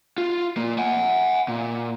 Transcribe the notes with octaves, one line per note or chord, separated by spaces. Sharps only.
F4
A#2 A#3
F#5 G#5
A#2